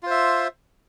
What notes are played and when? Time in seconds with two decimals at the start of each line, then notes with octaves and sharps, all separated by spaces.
0.03 F4
0.07 C5
0.11 E5